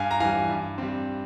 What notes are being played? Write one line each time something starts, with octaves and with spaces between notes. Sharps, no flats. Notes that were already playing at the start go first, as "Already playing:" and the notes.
Already playing: G2 F5 G#5
A#5
E3 G3 F5 G#5
G2
G3 C4